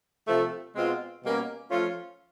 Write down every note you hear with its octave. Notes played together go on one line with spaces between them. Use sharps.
C3 F3 A3
B2 G#3 C4 F4
B2 G3 A#3 C#4
F3 A3 C#4 F4